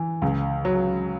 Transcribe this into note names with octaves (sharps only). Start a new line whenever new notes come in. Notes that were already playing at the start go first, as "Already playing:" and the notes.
Already playing: E3
C#2
F#3